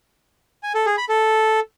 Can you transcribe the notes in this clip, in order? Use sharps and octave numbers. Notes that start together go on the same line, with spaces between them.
G#5
A4
G#4
B5
A4